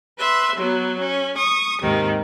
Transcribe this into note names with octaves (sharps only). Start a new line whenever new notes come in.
B4 E5 C6
F#3 B3
C#4
C#6 D#6
D#2 G#2 C3 D#3